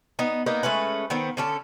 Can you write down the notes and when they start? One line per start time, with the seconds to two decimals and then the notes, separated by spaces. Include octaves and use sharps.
0.19 B3 D#4
0.46 A#3 B3 D#4
0.63 G#3 A3 C#4 B4
1.10 D#3 B3 C4
1.37 D3 C#4 A4